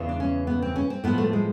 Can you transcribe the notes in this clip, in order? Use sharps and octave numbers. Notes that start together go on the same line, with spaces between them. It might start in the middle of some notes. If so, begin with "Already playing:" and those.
Already playing: E2 C#3 E3
D4
C#4
B3
C4
C#4
C4
A2 F3 B3
A3
G#3